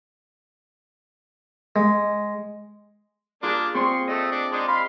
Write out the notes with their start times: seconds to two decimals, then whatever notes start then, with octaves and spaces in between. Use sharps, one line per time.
1.76 G#3
3.43 A#3 D4 F4 G#4
3.75 C4 G#4 C6 C#6
4.08 A3 D#5
4.32 D4
4.52 G#3 D4 D#4
4.68 F5 B5 C6